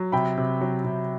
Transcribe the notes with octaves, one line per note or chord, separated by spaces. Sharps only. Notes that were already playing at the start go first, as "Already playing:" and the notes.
Already playing: F#3
C3 G5 B5
C3
F#3
C3